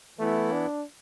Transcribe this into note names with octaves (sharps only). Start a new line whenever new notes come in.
E3 A3 B3 E4
D4